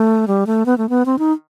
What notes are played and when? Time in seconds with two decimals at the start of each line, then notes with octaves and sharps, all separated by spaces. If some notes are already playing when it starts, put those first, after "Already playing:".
Already playing: A3
0.28 G3
0.47 A3
0.66 B3
0.78 A3
0.89 B3
1.06 C4
1.19 D#4